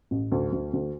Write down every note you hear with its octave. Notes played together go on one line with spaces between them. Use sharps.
A1
D2
D2
D2